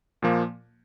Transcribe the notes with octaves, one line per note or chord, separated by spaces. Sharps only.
A#2 F3 A#3